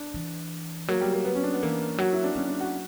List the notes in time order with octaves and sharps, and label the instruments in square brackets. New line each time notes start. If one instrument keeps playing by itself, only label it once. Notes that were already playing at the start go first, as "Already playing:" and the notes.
Already playing: [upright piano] D4
[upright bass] E3
[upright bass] F#3 [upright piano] A#3
[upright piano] G3
A#3
B3
C#4
D4
B3
[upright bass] E3 [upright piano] A#3
[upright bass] F#3 [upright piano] F#4
[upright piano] E4
D4
[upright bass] F#3 [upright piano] C#4
[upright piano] D4
F#4